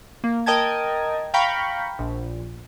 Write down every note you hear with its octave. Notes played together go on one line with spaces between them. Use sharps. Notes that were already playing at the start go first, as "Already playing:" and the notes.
A#3
A#4 D#5 G5 A5 G#6
F5 G5 A#5 B5 C#6
A#1